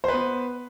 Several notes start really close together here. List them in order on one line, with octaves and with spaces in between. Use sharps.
C5 B4 B3